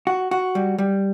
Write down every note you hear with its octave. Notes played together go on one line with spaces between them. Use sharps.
F#4
F#4
G3
G3